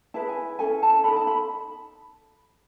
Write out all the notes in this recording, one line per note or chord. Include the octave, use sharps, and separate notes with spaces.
E4 G#4 B4 A5
G#5
C#4 E4 A4 G#5
A5
D#4 A4 B5
A5
B5